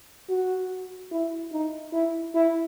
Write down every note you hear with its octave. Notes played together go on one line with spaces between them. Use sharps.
F#4
E4
D#4
E4
E4